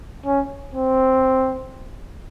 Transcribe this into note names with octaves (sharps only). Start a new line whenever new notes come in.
C#4
C4